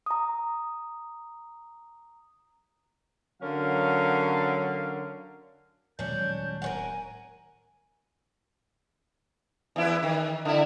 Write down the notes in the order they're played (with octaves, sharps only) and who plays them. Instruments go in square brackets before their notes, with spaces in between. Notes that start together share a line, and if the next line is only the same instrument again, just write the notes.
[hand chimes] A#5 D#6
[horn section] D3 F#3 C#4 A#4 F5
[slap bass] D#1 F#3 G#3 [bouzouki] C#4 D4 [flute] G6
[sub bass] D1 [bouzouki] A#4 C#5 F#5 [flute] G#5
[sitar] E2 E4 B4
D#3
D3 E4